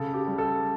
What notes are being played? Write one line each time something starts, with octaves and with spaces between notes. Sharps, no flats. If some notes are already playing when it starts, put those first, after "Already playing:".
Already playing: C#3 A4
G4
G3
A4